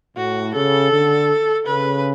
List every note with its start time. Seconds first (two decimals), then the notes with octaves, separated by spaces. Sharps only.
0.16 A2 F#4
0.54 C#3 A4
0.92 D3
1.66 C#3 B4